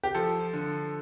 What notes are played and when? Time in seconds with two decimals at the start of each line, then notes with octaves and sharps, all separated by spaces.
0.04 G4
0.15 F3 A4
0.54 D3